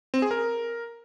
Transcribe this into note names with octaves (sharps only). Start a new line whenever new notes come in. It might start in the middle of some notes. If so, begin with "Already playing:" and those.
C4
G#4
A#4